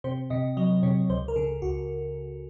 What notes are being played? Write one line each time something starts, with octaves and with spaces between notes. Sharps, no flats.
C3 C5
C3 D#5
F#3 D#5
C3 C#5
C#2 C5
A#4
C#3 A4
C#2 F#4